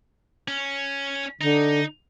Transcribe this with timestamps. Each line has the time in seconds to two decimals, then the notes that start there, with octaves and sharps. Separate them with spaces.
0.48 C#4
1.41 D3 D#4